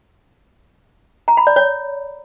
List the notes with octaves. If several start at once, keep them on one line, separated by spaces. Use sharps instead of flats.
A#5
B5
D5
C#5